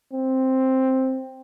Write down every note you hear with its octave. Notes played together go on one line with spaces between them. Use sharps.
C4